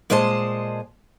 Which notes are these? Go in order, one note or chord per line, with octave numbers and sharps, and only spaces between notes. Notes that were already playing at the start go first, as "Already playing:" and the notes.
A#2 G#3 C5 D#5 A5